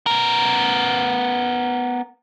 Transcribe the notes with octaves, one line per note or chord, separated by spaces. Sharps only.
B3 A#4